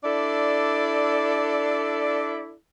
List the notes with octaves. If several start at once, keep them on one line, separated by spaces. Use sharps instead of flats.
D4 E4 A4 D5